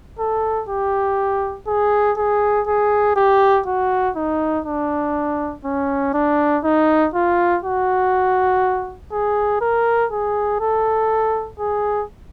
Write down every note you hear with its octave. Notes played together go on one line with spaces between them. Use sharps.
A4
G4
G#4
G#4
G#4
G4
F#4
D#4
D4
C#4
D4
D#4
F4
F#4
G#4
A#4
G#4
A4
G#4